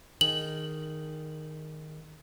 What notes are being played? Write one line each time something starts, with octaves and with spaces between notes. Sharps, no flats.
D#3 G#4 F#7